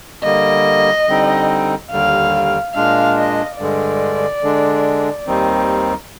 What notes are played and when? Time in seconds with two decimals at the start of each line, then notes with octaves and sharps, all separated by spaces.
0.23 D3 G3 A#3 D#5
1.08 D3 G3 C4 D#4
1.91 D#2 D3 G3 F5
2.74 A#2 G#3 D4 F5
3.18 D#5
3.58 G2 D3 G#3 D5
4.42 D3 G#3 D4
5.27 D#2 D#3 G3 C4 D#4